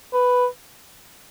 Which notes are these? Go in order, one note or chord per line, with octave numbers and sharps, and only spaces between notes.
B4